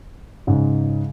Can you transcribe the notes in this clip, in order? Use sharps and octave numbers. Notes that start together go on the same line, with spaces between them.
G#2 C#3